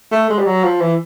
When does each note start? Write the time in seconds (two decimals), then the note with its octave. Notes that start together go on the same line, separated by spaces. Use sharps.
0.12 A3
0.30 G#3
0.38 G3
0.46 F#3
0.64 F3
0.81 E3